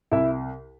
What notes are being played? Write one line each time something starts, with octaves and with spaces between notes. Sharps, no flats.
C2 E4 E5